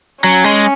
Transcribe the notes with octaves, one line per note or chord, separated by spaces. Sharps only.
F#3 C#4
G#3